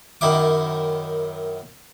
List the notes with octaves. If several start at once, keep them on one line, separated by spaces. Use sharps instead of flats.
F#2 D#3 E4 D6